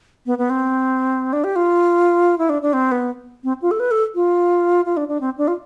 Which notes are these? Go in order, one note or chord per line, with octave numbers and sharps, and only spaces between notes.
B3
B3
C4
D4
G4
F4
E4
D4
D4
C4
B3
C4
F4
A4
B4
A4
F4
F4
D4
D4
C4
D4
F4